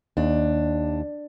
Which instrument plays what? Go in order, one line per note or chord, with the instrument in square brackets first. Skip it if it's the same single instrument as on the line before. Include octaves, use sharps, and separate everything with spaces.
[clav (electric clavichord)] D#2 [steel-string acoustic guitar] D4